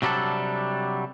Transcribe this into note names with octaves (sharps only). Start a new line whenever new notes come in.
C3 F#3 G3 D4 A4